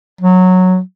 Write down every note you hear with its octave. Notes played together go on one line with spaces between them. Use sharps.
F#3